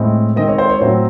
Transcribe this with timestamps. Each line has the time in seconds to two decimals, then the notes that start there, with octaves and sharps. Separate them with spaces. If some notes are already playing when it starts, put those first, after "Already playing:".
Already playing: A2 G#3 C4
0.36 D#3 G#3 C4 D#5
0.48 C#5
0.58 C5
0.69 C#5
0.80 A2 F#3 C4 C5